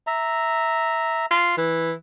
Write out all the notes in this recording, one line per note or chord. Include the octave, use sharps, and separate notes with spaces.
E5 A#5
F4
E3